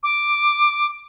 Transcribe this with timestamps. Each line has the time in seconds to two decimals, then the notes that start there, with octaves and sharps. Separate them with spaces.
0.03 D6